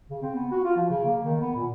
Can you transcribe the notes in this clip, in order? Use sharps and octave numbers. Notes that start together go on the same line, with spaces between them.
C#3
C4
B3
F#4
F4
F3
C#3
A#3
D#3
B3
A#2